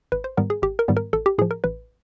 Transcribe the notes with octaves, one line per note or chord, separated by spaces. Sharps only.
G#1 B4
C5
G#2 D#3 G3 B3 A#4
G#4
G#1 G4
A#4
G#2 D#3 G3 B3
A#4
A1 A4
G4
A2 F3 G#4
A#4
A1 B4